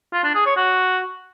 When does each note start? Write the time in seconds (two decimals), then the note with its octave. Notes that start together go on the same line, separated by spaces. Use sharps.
0.13 F4
0.24 D4
0.35 G#4
0.46 C#5
0.57 F#4